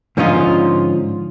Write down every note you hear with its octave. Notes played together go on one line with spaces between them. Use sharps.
G#2 D3 F3 C#4 D#4 F4